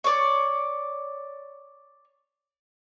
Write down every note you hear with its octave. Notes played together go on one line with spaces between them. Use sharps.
C#5 D5